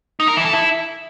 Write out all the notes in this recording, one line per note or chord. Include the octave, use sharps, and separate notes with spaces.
D#4
A#4
E3
A4
E4